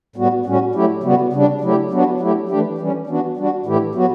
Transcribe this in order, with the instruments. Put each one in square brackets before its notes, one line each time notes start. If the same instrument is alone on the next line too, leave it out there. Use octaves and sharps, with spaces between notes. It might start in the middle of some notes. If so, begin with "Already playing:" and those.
[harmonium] A2 G3 B3 F#4
A2 G3 C#4 F#4
F#3 A3 E4 G4
C#3 G3 B3 F#4
C#3 G3 D4
F#3 A3 E4 G4
F#3 B3 D4 F#4
F#3 A3 E4 G4
E3 A3 D4 G4
E3 G3 C#4
E3 B3 D4 F#4
G3 D4 F#4
A2 E3 A3 E4 G4
F#3 B3 F#4